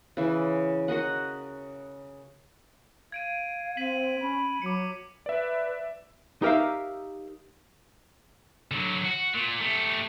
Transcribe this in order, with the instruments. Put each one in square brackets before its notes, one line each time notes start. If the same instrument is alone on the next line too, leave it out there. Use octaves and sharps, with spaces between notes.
[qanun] C#3 E3
F#4 A#4 D#5 F#5
[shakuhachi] F5 [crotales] G#6 D7 D#7
[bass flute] C4 [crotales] B6 D#7 F#7
[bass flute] C#4 [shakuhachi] B5
[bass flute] F#3 [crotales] D6 C#7
[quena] B4 [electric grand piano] D5 E5
[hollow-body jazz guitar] D#4 G4 A#4 E5 F5
[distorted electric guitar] D3 F#3
F#4
A#2
A3 G4